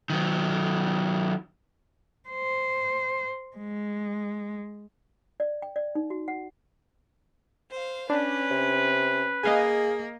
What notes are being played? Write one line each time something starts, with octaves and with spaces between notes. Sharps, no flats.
D#3 F#3
C5
G#3
D5
G5
D5
D#4
F#4
F#5
C5 F5
C#4 D4 B4
C3
A#3 G#4 D#5 F5 G#5